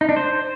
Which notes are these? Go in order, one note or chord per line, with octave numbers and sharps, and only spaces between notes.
D#4
D4
C5